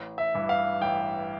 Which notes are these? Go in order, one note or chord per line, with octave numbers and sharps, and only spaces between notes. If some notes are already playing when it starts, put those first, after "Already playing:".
Already playing: A1
E5
G2 E3
F5
A1 G5